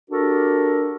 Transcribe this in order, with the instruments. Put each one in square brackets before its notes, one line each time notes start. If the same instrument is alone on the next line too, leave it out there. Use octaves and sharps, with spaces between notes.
[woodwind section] D4 F#4 G4 A4 A#4